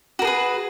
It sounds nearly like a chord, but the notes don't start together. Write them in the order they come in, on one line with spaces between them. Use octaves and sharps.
F#4 A#4 G#4 B4